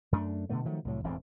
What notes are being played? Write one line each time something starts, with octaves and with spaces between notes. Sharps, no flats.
F#2 A3 B3 D4
B2 D3 A3 B3
D#3 F3 F#3 A3
C2 A2 F#3
E1 E2 A2 C4